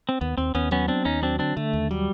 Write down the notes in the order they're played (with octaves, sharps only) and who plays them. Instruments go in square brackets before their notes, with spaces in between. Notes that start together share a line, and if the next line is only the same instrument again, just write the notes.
[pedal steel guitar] C4
[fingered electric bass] D#2 [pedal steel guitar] B3
[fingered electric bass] D#2 [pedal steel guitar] C4
[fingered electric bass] D#2 [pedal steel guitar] B3 C#4
[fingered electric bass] F#3 [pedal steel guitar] B3 C#4
[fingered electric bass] B3 [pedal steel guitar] C4 D4
[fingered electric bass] D#2 [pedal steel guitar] C#4 D#4
[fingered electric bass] F#3 [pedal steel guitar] C4 D4
[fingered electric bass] D3 [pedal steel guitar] C4 D4
[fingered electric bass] D3 [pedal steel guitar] A3
[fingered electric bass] D#2
[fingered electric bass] F#3 [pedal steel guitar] G3